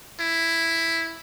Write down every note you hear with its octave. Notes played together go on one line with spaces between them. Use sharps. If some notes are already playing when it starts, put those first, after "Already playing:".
E4